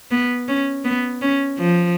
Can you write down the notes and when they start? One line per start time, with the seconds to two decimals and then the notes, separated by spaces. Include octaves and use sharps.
0.11 B3
0.48 C#4
0.85 B3
1.22 C#4
1.59 F3